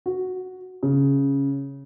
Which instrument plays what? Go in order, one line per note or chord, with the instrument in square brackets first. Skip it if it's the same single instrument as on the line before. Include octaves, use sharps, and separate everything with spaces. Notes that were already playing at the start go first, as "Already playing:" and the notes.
[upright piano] F#4
C#3